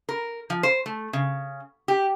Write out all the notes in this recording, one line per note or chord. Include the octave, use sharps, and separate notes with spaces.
A#4
F3
C5
A3
C#3
G4